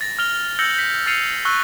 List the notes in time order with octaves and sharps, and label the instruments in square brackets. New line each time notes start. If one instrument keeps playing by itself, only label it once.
[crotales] A6 A#6
F6 F7 G7
E6 G6 A#6 C#7 F#7 G7
G6 B6
F6 A6 C7 C#7 D#7 F7
C#6 E6 F#6 G7